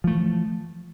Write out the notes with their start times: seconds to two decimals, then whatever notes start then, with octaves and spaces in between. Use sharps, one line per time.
0.04 F3
0.07 A3
0.10 E3